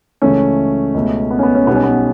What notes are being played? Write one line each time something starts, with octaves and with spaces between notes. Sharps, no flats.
C#2 C#3 E3 A3 C#4
C#2 B2 A3
B3
C#4
B3
C#4
B1 B2 G3 B3
C#4
B3